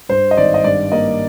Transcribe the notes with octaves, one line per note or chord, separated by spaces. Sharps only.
G2 C5
D#5
G#1 D5
D#5
G2 D5
A#3 D#5